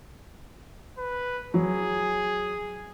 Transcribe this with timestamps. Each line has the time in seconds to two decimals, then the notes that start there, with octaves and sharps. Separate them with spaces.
0.98 B4
1.54 F#3 G#4